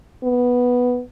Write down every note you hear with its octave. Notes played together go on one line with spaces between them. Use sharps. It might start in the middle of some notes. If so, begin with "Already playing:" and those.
B3